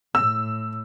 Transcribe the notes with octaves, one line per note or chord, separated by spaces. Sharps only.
A2 E6